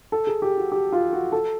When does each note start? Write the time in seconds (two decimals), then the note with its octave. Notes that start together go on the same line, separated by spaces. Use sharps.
0.12 A4
0.27 G#4
0.42 G4
0.57 F#4
0.72 G4
0.92 F4
1.13 F#4
1.32 A4